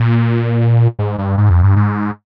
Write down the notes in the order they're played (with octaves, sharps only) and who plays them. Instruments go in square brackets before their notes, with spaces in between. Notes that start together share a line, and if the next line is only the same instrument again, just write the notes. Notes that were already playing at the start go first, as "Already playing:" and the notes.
Already playing: [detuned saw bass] A#2
G#2
G2
G#2
F2
G2
G#2